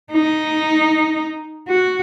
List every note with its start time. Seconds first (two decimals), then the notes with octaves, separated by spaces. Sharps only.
0.12 D#4
1.69 F#4